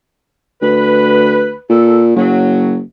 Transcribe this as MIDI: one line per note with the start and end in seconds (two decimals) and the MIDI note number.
0.62 1.53 38
0.62 1.60 71
1.69 2.12 46
1.69 1.99 69
2.16 2.80 30
2.16 2.74 54